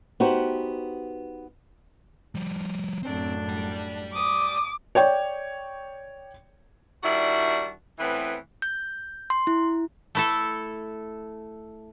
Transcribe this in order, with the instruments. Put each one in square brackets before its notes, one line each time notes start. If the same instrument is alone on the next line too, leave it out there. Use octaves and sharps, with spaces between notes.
[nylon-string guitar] B3 D#4 F#4 G4 C5
[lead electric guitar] F3 G3
[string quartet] F#2 A2 D4 [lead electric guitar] C4
[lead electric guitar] D5 G5
[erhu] D6 [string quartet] D#6
[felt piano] C#5 D5 G5
[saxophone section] D#3 G3 D4 E4 F#4
A2 E3 B3 C4 B4
[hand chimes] G6
C6
E4
[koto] A3 E4 A4